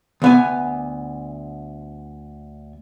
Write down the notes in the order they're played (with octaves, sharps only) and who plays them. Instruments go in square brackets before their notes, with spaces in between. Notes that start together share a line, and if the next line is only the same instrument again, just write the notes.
[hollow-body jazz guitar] D2 B3 G#5